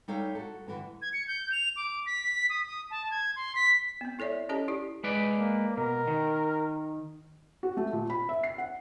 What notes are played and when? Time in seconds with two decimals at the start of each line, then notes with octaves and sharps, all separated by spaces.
0.08 G3 D#4 A4 C#5 F5
0.35 F#4 A4
0.67 G2 D3 E3
1.02 G#6
1.13 C#7
1.28 G6
1.52 F7
1.76 D6
2.06 B6
2.49 D#6
2.66 D#6
2.91 A5
3.11 G#6
3.36 C6
3.56 B6
4.01 B3 C4
4.19 E4 A4 C#5 D5 E5
4.49 C#4 G4 A4 C#5 D#5 A#5
4.68 E4 G4 D5
5.04 G#3 B4 D5
5.38 A#3
5.77 B2 A#4
6.07 D#3
7.63 F#4
7.77 A3
7.93 A#2
8.10 B5
8.29 E5
8.43 C7
8.58 F#5